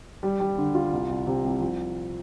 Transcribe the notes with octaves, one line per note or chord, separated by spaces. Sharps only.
G3
G3
D3
F4
C2
C2
C3
C2
F3